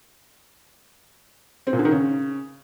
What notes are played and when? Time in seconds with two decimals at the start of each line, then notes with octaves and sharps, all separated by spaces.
1.67 C4
1.73 A#2
1.79 D3
1.85 D#3
1.91 C#3